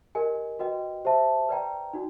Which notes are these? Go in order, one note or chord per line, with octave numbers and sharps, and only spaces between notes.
G4 A#4 D#5 G#5
F#4 B4 D#5 G5
G4 C5 E5 A5
B4 D5 G5 A#5
D#4 F#4